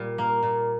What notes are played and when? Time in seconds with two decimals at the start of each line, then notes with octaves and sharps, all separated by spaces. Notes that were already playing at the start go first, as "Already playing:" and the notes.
Already playing: A#2 G3
0.18 A#3
0.43 A#2